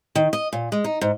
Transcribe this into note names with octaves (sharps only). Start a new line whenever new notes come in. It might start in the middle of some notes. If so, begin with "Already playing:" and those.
D#3
D#5
A#2
G#3
D#4
G#2